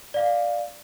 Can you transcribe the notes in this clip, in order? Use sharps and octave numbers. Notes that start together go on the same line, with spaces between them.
D5 F5